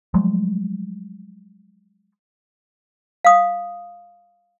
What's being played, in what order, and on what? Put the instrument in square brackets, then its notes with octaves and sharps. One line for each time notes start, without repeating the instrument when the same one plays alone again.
[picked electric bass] F3 F#3 G#3 A3
[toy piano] F5 D#6